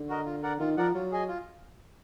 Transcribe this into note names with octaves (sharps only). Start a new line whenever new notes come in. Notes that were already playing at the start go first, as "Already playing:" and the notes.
Already playing: D3
F#4 A#4 D#5
F4
A#4 D5 F#5
D#3 F4
F3 A#4 D5 F#5
F#3 F4
G#4 D#5 G#5
F4